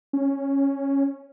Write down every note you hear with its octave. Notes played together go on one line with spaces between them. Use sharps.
C#4